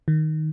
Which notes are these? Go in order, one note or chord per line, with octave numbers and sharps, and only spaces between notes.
D#3